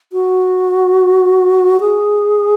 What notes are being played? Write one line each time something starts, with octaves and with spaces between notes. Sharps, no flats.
F#4
G#4